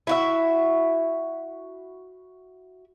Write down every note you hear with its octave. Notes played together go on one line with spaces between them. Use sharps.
E4 F#4 E5